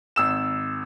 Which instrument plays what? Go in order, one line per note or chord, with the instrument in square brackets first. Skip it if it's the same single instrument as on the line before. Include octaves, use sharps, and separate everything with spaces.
[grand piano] G#1 E6 E7